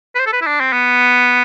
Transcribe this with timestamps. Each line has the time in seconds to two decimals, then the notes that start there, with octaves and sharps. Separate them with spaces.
0.15 B4
0.19 C5
0.26 A4
0.33 B4
0.42 E4
0.46 D4
0.60 C4
0.73 B3